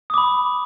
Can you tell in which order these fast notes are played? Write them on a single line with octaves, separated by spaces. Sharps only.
D#6 D6 B5